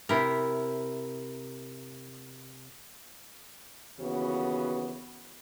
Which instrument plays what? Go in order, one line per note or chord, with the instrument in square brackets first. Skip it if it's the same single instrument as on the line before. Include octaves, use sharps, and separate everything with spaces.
[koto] C3 E4 A#4
[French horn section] D#2 C#3 E3 B3 F#4